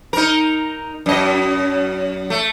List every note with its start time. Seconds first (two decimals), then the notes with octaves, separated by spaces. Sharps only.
0.13 D#4 A#4
1.06 F#2 D#5
2.30 A3